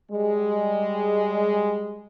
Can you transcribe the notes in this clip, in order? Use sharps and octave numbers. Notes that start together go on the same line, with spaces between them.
G3 G#3